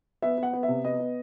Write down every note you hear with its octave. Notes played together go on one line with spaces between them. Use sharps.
B3 E5
B3
F#5
B3
E5
C3
B3 D#5
B3